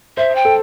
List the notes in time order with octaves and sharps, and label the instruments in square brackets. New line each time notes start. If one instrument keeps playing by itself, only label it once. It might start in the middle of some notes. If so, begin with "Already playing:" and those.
[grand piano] C5 [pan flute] E5
[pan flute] G5
[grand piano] A4